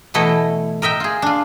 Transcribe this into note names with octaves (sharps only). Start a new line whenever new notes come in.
B2 E3 A3 E4 D#5
A#4 D#5 E5 G5
F4 G#4
D4 F4